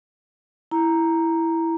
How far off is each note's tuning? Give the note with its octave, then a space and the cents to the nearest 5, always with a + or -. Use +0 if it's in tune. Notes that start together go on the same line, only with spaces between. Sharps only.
E4 +0 A#5 +0